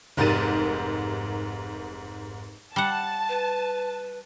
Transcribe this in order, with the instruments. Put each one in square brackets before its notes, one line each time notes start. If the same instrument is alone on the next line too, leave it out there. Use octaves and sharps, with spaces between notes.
[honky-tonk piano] F1 G#2 G4 A#4 A6 D#7
[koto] G3 F#5 [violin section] A5
[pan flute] B4